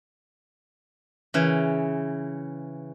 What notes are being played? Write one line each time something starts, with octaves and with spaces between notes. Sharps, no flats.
C#3 E3